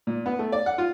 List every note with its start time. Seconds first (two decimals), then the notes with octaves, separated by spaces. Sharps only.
0.07 A#2
0.26 B3
0.39 A3
0.52 D5
0.66 F#5
0.78 F4